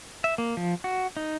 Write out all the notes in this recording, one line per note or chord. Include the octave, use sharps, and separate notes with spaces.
E5
A#3
F3
F#4
D#4